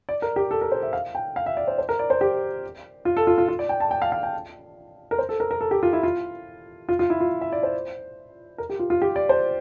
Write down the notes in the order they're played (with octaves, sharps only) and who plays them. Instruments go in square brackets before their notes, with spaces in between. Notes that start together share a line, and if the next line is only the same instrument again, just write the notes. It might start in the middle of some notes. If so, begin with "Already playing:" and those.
[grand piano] D5
A#4
G4
A4
A#4
C5
E5
F5
G5
F5
E5
D5
C5
C5
A#4
D5
C5
G4
F4
A4
F4
F4
F4
D5
G5
A5
G5
F5
F5
G5
A#4
C5
A4
A#4
A#4
A4
G4
F4
E4
F4
F4
F4
E4
F4
E5
D5
C5
A#4
G4
F4
F4
G4
D5
C5